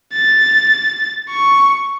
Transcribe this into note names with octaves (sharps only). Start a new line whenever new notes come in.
A6
C#6